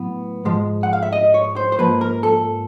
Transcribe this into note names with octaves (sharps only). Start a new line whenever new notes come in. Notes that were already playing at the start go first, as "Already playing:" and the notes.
Already playing: A2 F#3 B3
G#2 F3 G#3
F#5
F5
E5
D#5
C#5
C5
C5
G#2 F3 A#3 B4
A#4
A4